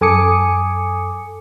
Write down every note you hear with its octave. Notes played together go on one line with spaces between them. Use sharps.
F#2 A4 G#5 D6 D#6 C#7